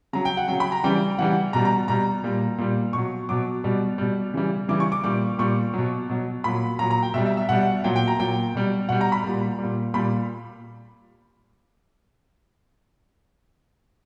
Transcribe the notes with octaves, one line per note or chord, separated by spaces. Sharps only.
C#3 F#3 A#5
G5
F#5
C#3 F#3 G5
B5
A#5
C#3 E3 G3 G5
C#3 E3 G3 F#5
B2 G3 A#5
A#5
B2 G3 A#5
A#2 G3
A#2 G3
B2 F#3 C#6
B2 F#3 D6
B2 G3
B2 G3
C#3 E3 G3
C#3 E3 G3 D6
C#6
D6
A#2 G3 D6
A#2 G3 C#6
B2 F#3
B2 F#3
A#2 F#3 B5
A#2 F#3 A#5
A#5
G5
B2 G3 E5
E5
E5
B2 G3 F#5
A#2 F#3 G5
G5
A#5
A#2 F#3 G5
B2 G3
B2 G3 F#5
A#5
B5
A#2 G3
A#2 G3
A#2 G3 B5